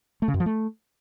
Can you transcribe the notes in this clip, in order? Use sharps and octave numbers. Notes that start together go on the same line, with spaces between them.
A3
C#3
F#2
F3
A3